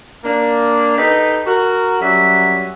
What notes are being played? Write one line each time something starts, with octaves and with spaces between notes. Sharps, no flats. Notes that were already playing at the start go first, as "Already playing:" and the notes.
A#3 D4
D#4 G4 A4 B4 D#5
F#4 A#4
F#2 F#3 G3 C#4 F#4 E5